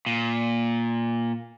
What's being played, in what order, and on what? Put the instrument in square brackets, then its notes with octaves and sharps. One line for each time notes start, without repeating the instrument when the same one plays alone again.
[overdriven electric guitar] A#2